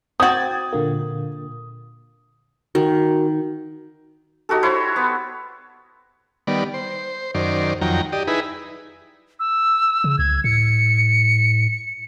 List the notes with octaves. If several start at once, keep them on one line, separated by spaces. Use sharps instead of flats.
C4 F#4 G5 D#6 G#6 A6
A#2 D3 A#3
D#3 F#4 A#4
D#4 F#4 G4 A4
E4 C5 C#5
B3
D#3 G3 B3 D5
C5
F#2 D#3 C5 D5
F2 D#3 F#3 G5 A#5
G4 D5 D#5
D#4 E4 G#4 B4
E6
C#3
C#2 G#6
A2 C#7